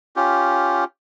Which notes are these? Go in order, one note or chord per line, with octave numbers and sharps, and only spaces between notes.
C#4 F4 G4